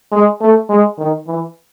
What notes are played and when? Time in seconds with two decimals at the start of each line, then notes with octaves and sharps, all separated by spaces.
0.12 G#3
0.41 A3
0.69 G#3
0.98 D#3
1.27 E3